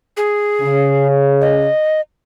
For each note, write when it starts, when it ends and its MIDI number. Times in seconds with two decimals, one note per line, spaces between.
0.17 1.07 68
0.61 1.67 49
1.41 2.01 75